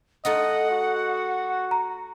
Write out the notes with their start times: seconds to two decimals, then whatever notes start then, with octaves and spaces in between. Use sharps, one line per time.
0.25 A3 D#4 F4 D#5 F#5
0.71 F#4
1.71 A#5